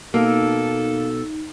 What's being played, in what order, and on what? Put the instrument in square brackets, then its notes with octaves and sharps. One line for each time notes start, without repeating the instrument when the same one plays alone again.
[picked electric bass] B2 [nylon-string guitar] A#3 [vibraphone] D#4 [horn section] A4